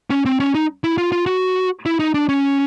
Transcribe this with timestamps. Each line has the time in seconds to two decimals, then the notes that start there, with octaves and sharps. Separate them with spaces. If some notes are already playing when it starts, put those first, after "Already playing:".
0.10 C#4
0.25 C4
0.40 C#4
0.55 D#4
0.84 E4
0.98 F4
1.12 F4
1.26 F#4
1.86 E4
1.99 D#4
2.14 D4
2.29 C#4